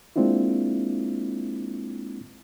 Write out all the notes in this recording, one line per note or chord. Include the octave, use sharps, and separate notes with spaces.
G#3 A#3 C4 D4 E4 F4